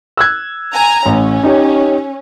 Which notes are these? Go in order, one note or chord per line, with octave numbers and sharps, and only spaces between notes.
E6 F#6 G#6
G#5 A#5
A1 C#4
D#4 G4 C#5